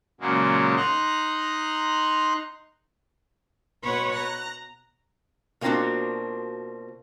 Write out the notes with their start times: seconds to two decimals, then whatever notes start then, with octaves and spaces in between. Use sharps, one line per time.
0.21 A#2 C#3 F#3 G#3 A#3
0.77 D#4 A#5 C6 F#6
3.82 B2 B4 C#5 F#5 C6 C#6
4.11 A#5 F#6
5.61 B2 A#3 C4 D4 F4 F#4